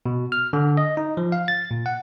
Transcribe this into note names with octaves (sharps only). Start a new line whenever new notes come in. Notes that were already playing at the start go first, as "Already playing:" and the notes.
B2
F6
D3
D#5
D#4
F3
F5
A6
A#2
F#5